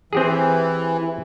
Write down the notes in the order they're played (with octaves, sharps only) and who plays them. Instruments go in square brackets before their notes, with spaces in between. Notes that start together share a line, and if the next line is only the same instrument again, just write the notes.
[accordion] E3 [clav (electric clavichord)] C4 G4 G#4